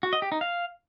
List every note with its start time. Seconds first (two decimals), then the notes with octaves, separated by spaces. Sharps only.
0.03 F#4
0.13 D#5
0.22 G4
0.32 D#4
0.41 F5